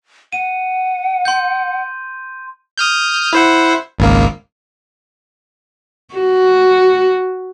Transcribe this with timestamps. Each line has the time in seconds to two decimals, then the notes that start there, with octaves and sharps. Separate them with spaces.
0.33 F#5 D#7
1.25 C6 G6
2.78 D#6 F6 G6
3.33 E4 C5 F#5
3.99 G#1 C#2 A#3
6.15 F#4